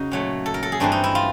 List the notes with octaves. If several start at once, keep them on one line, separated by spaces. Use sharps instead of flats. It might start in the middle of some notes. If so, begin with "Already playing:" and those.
Already playing: C#3 D#4 F#4
A#2 F#3 A3
A4
A#4
A4
G#4
G2 E3 A3 C4 D4
D#4
E4
F4